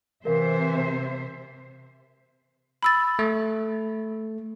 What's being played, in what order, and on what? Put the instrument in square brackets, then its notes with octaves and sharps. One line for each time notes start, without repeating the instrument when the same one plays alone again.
[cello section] C3 C5 E5 [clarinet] E3 [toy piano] A#4 F5
[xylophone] B5 E6 A6
[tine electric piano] A3